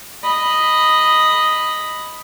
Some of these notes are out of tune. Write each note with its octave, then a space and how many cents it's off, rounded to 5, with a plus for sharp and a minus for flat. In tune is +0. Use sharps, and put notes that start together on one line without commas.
D#5 +0 B5 +0